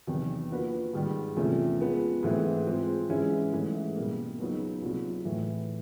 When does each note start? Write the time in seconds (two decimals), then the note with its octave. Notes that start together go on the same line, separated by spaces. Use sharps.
0.07 E2 C3 D#3 F#3
0.51 F3 A#3 D4 F#4 B4
0.93 G#2 D#3 G3
1.37 E2 C3 F3 A3 C#4
1.80 F3 G#3 B3
2.23 G#2 E3 A3 C4
2.66 F3 G#3 C4
3.09 G#2 E3 G#3 C#4 E4
3.53 G#2 E3 A3
3.95 B2 G3 A#3
4.38 C#2 C#3 F#3 B3 D#4
4.82 C2 A#2 F#3
5.25 A2 E3 A3